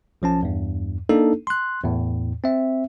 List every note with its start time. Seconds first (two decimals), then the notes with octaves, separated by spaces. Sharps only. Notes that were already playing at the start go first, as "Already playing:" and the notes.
0.22 B1 F3 C#4 A5
0.43 E2 G2
1.09 A#3 D4 D#4 A4
1.47 C6 F#6
1.83 E2 A2
2.44 C4 E5